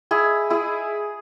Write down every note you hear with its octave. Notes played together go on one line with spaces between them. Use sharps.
E4 G#4
E4 G#4